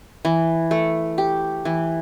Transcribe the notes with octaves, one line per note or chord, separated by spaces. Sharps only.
E3
A3
G4
E3